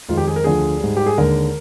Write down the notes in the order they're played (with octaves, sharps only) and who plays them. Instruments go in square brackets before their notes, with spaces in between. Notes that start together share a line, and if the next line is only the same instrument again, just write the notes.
[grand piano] F2 D#3 G#3 F4
G4
G#4
A#4
D2 D3 F3 G#4
G#2 G3
G4
G#4
D#2 D3 G#3 A#4